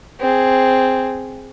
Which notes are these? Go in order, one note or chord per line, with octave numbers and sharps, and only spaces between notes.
C4 G#4